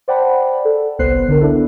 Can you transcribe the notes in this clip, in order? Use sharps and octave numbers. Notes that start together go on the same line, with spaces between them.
C5 D5 F#5 G5 A5 B5
A4
G1 C2 B3 C5 F#6 C7
D3 D4 A#4
B3 D4 E4 A4